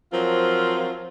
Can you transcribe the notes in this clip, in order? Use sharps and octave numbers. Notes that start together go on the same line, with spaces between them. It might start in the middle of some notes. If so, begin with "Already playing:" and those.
F3 F#3 C4 F4 A#4